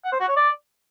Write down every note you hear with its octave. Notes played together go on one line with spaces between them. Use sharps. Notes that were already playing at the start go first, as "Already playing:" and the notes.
F#5
C5
F#4
C#5
D5